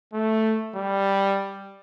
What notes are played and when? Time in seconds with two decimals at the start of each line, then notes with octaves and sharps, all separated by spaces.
0.13 A3
0.75 G3